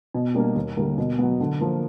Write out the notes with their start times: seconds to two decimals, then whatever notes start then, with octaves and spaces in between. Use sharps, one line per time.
0.14 B2
0.35 G3 A#3 D4
0.55 D#2
0.77 D3 G3 A#3
0.98 B2
1.19 F#3 B3
1.40 D3
1.61 F3 A#3